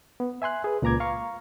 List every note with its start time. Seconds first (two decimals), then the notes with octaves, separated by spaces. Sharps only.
0.20 B3
0.42 E5 G#5 C6 F#6
0.64 G#4 B4
0.82 C#2 A#2 B4 A#5 D6 G#6
1.00 F5 A#5 C#6